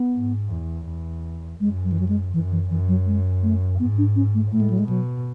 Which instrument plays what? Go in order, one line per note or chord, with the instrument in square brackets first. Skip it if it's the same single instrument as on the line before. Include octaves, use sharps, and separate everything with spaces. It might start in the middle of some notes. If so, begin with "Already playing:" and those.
Already playing: [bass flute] B3
[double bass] G#2
E2
E2
[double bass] F#2 [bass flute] G#3
[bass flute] F#3
E3
F#3
G#3
[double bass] F#2 [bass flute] E3
[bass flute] E3
[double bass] F#2 [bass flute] E3
[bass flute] F#3
G#3
A3
[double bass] G#2 [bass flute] B3
[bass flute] D4
C#4
A3
[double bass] A2 [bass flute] A3
[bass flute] G#3
F#3
G#3
[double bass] B2 [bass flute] F#3